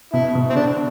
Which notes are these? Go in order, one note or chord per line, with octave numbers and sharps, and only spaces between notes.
B2 E4
B2
C4
D3 D4